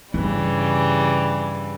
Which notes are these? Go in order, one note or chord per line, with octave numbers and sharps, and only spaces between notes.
G2 C#3 E3 G3